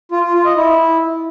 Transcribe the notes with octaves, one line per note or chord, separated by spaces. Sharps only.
F4
F4
F4
D#5
E4